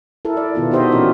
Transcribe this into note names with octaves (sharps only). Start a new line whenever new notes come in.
E4 A4 A#4
D5
B2 D#3 B3 E4 F4
D#4 F#4 G4 C5 D#5 E5
A#2 E3 C#4 D4 F#4 A#4